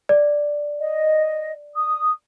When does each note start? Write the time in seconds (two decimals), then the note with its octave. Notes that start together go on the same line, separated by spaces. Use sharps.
0.09 D5
0.80 D#5
1.74 D#6